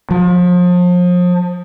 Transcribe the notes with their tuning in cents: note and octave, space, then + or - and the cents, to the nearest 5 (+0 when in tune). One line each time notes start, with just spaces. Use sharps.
F3 +35